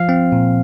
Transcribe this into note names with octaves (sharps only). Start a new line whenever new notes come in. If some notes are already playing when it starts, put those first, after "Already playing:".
Already playing: F3 F5
C4
A#2